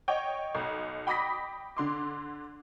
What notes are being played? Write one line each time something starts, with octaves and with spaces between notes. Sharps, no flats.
C#5 D#5 G5
B1
G5 B5 D6 D#6 A#6 B6
D3 C6 D6